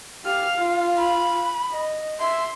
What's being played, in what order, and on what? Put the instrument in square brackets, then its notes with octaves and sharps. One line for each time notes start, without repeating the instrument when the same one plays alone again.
[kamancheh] G4 F6 [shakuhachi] F5
[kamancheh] F4
[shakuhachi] B5
[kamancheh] D#5
[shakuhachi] E5 [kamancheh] C6